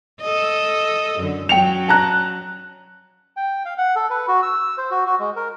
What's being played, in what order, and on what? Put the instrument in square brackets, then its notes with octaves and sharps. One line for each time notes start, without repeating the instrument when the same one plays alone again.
[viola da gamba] A4 D#5
F#2 D3
[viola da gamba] F#3 C#4 [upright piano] G5 C#7 F7
[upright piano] A5 A#5 F#6
[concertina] G5
F5
F#5
A4
B4
F#4
E6
C5
F#4
F#4
G#3
A#4